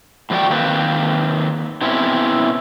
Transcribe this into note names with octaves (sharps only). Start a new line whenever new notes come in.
A2 F3 A3 F#4 D5 G5
D#3 A#3 C4 B4
B2 C4 C#4 E4